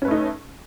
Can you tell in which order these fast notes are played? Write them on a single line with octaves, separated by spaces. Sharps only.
C#4 B4 A3 D#4